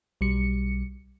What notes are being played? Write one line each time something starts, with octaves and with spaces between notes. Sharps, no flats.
B1 G3 C#7